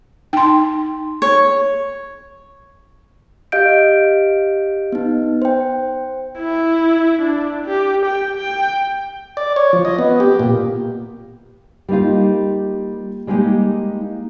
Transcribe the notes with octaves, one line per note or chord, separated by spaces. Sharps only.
D#4 G5 C6
C#5
G4 D#5 F5 G6 D7
B3 D#4
C5 G5
E4
D4
G4
G5
G5
D5
C#5
F3
D#5
B3
G4
A#2
G3 A#3 D#4 F4
G3 G#3 A#3 D#4 G4